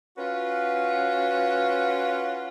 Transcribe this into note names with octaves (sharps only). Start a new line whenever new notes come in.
C#4 F4 F#4 B4